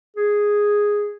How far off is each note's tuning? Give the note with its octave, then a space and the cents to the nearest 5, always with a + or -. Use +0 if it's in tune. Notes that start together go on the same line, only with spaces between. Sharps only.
G#4 -5